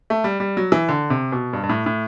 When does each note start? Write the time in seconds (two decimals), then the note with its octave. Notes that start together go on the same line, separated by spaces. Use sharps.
0.10 A3
0.24 G3
0.40 G3
0.57 F#3
0.72 E3
0.89 D3
1.10 C3
1.32 B2
1.53 G2
1.63 G2
1.69 A2
1.86 A2